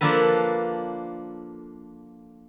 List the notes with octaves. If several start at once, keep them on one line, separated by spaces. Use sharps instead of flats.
F3 A#3 D4 A4 B4